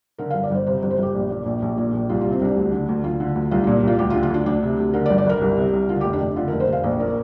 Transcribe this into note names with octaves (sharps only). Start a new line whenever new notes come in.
D3 A#4
G1 F5
D5
G1 C5
C3 C5
G1
C5
G1 G4
A#1
A#2
A#1
A#1
A#2
A#1
C2 F4
C3 F4
C4
C2 D4
D2
D3
D2
D2 F4
D3
D2
C2 F4
A#2 D4
C2 F4
D2 G4
F4
D3
F4
D2 D4
D2 D4
C3
D2
D3 A#4
D5
G1
D5
G1 A#4
C2
C3
C2
D3 F4
F1 G4
D4
F1
D3 F4
F1 A#4
C5
F1 F5
A#1 C5
A#2 A#4